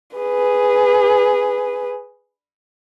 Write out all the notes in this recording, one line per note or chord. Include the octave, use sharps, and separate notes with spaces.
G#4 B4